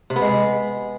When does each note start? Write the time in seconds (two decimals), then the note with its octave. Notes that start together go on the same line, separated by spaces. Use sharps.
0.10 C3
0.16 B3
0.22 G#3